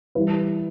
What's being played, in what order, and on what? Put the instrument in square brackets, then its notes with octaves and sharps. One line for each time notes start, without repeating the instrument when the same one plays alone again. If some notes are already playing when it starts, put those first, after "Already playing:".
[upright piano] E3 G3 B4